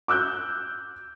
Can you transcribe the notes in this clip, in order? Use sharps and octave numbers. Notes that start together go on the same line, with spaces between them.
D6 E6 F#6 G6